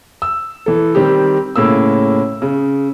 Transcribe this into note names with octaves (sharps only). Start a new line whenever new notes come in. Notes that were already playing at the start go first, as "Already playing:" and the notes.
E6
E3 A4
D#3 G3 C4 G4
A2 C#3 A#3 E6
C#3